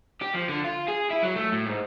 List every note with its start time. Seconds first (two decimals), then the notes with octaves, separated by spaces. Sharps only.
0.22 G4
0.34 F3
0.49 D3
0.64 F4
0.88 G#4
1.11 E4
1.23 F#3
1.36 A3
1.52 A2
1.67 G#2